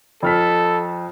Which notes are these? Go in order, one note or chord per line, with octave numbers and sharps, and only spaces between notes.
F2 A4 F6 B6